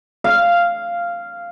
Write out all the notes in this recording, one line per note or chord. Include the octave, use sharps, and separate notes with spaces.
F5